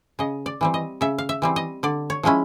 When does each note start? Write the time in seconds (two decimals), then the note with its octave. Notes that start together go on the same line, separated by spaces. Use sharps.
0.19 C#3 D#5
0.46 D5
0.61 E3 G3 C4
0.74 D#5
1.01 C#3 E5
1.18 F5
1.29 E5
1.42 E3 G3 C4
1.56 D#5
1.83 D3 D5
2.10 C#5
2.23 F3 G#3 C#4 E4